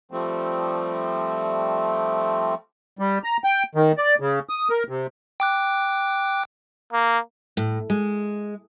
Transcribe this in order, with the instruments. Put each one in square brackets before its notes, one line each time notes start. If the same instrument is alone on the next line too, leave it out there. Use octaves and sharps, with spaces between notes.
[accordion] F3 G3 A3 C4
G3
A#5
G5
D#3
D5
C#3
D#6
A#4
C3
[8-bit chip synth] G5 D6 F#6
[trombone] A#3
[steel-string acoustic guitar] A2
G#3